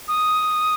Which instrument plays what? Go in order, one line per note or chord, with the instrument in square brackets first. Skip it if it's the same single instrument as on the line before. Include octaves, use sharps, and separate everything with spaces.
[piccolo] D#6